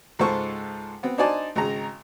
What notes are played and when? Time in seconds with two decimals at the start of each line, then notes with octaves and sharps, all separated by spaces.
0.19 C#2 G#2 F4 A4 C5 C#6
1.03 B3 C4
1.18 D4 D#4 C5 D5 G#5 A5
1.56 G#1 C#3 A#5